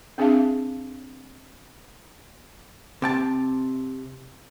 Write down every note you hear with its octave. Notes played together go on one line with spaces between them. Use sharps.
C4 D4 G#4 E5 F5 A5
C3 G5 A5